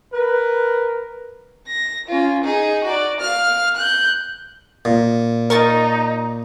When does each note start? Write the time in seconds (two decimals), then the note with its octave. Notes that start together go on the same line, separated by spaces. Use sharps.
0.13 A#4 B4
1.67 A#6
2.08 C#4 F4
2.43 D#4 G#4
2.84 F#4 D5
3.20 F5 F6
3.76 F#6 G6
4.85 A#2
5.50 D#4 A#4 C#6 A6